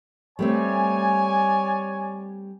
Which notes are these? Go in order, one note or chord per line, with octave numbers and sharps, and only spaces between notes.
G3 A3 C4 C#5 D5 G#5